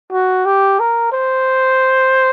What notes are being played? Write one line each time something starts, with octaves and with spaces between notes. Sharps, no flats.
F#4
G4
A#4
C5